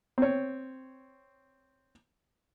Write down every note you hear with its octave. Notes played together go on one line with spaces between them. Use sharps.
C4 C#5